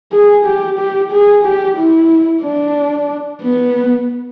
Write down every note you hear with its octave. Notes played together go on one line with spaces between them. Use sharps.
G#4
G4
G4
G#4
G4
E4
D4
B3